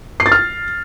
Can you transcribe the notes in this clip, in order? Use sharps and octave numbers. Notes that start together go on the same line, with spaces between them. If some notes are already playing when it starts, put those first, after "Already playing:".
C7
A6
F6